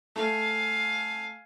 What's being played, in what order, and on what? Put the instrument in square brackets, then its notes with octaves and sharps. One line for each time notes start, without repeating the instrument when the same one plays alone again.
[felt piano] A3 [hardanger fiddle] F5 G#5